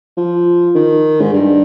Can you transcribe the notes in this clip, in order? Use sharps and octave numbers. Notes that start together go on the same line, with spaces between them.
F3
D#3
G#2
G2